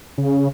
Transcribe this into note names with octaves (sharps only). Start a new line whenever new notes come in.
C#3